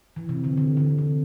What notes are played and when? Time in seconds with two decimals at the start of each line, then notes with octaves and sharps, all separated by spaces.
0.16 E3
0.29 C3
0.44 D3
0.57 D3
0.77 D3
0.98 C3